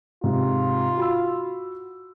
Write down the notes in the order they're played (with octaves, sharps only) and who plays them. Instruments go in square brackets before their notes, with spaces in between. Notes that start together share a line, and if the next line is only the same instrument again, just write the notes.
[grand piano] G#2 C3 [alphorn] F4
[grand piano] F#4 B5 E6